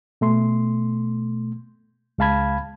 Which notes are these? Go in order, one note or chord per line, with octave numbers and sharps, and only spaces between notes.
B2 A3 C6
C#2 G#3 F5 A5 B5 G#6